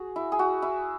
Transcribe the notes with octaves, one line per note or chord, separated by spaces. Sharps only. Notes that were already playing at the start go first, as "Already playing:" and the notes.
Already playing: F#4 G#4
E4
G#4
F#4
E4